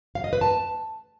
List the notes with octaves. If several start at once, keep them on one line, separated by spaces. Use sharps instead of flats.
F5
D#5
B4
A5